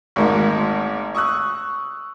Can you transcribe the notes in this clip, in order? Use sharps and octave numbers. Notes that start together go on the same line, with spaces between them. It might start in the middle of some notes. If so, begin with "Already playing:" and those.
G#1 D2 G#3 A#3 D#4 D#5
C#6 D#6 E6 F#6